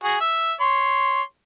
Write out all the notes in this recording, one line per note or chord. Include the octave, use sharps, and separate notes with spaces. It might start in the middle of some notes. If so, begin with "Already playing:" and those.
F#4 G#4
E5
C#5 C6